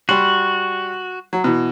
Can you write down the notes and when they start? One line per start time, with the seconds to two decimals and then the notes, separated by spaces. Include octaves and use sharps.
0.09 G3 F#4 C6
1.33 F#3
1.44 B2 E3